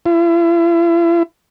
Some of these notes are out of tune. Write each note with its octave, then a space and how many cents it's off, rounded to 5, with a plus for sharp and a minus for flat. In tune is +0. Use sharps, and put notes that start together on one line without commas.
E4 +45